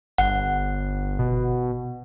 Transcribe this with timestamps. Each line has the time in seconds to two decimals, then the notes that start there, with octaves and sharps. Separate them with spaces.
0.18 G1 F#5
1.19 B2